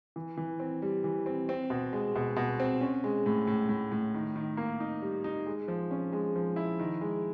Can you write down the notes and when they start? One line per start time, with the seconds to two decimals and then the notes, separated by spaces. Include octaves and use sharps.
0.16 E3
0.37 E3
0.60 C4
0.82 G3
1.04 E3
1.26 C4
1.49 C4
1.70 B2
1.93 G#3
2.15 B2
2.36 B2
2.60 C4
2.81 C#4
3.04 G#3
3.26 A2
3.47 A2
3.69 A2
3.92 A2
4.14 D#3
4.36 D#3
4.57 A#3
4.80 D#4
5.02 G3
5.24 D#4
5.46 G#3
5.68 F3
5.91 C#4
6.13 G#3
6.35 F3
6.56 E4
6.79 D#3
7.01 G#3